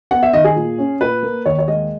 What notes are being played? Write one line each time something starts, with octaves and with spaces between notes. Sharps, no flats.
B3 F#5
E5
D#3 D#5
G#4
A#2
C#4
A#2 B4
A#3
D#2 C#5
C#5
G#3 D#5